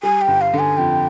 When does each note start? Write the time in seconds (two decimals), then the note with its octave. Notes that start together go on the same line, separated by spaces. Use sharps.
0.03 G3 G#5
0.21 G5
0.28 G1
0.41 F5
0.54 D3
0.59 G#5
0.77 F2 G5